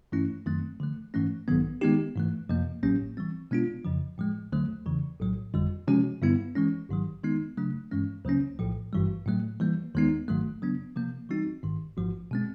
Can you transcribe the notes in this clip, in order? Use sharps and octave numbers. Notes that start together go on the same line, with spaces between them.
G2 E3 A3 C#4 E4
F#2 D#3 F#3 A3 C4
D3 F3 A3
G#2 E3 A3 C#4
A#1 G#2 D#3 F#3 B3
D#3 G#3 B3 D#4 G4
G#2 E3 A3
F2 C3 F3 A#3
A1 A2 F#3 A#3 C#4
E3 G3 C4
B2 G#3 B3 D4 F4
F2 C#3 F3
A2 F3 G#3
D2 D3 F#3 A3
E2 C#3 E3
B1 A2 F#3
G1 F2 D3 G3
C3 F3 G#3 C#4 F#4
G2 D3 G3 B3 E4
E3 G#3 C#4
A1 G#2 D#3 F#3
D#3 G#3 B3 D#4
C#3 F#3 A3 D4
G2 E3 G#3 C#4
D2 C#3 F#3 A#3 C#4
B1 A2 F3
G#1 G2 E3 G3
A2 F#3 A3
E3 G3 A#3
D#2 D#3 G#3 B3 D#4
G#1 G#2 D#3 F#3 A3
C#3 F#3 B3 D4
C3 F3 A#3
E3 G3 C4 D#4 F#4
A1 G#2 D#3
G#1 G#2 F3
B2 G#3 C4